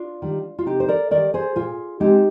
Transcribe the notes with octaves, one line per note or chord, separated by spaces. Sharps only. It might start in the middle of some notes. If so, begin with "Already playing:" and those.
Already playing: D4 F4
D#3 G3
F4
C3 D#4 G4
C5
A#4 D5
D#3 G3 A#4 D5
G#4 C5
A#2 F4 G#4
G#3 C4 D#4 G4